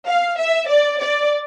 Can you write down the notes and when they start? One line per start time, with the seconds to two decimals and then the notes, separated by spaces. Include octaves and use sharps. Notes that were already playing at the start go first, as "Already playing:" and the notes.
0.08 F5
0.38 E5
0.69 D5
1.01 D5